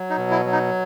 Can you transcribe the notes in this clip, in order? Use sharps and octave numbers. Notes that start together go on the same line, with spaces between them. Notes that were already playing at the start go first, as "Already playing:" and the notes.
Already playing: F#3
D#4
B2
E4
F#3
D#4